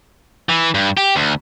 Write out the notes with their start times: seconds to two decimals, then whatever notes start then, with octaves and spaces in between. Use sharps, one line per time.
0.49 E3
0.75 G2
0.97 G4
1.16 D2